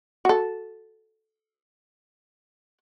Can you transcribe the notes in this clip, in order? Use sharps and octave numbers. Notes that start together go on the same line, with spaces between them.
F#4 A4